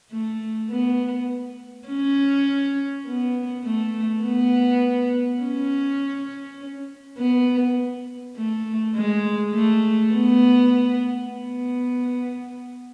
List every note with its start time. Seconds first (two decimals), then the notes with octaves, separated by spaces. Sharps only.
0.11 A3
0.70 B3
1.88 C#4
3.06 B3
3.64 A3
4.23 B3
5.41 C#4
7.18 B3
8.36 A3
8.95 G#3
9.54 A3
10.13 B3
11.31 B3